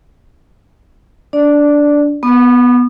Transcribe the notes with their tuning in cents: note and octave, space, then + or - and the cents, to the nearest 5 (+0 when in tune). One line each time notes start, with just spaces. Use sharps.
D4 -15 D5 +0
B3 +0 D#6 -40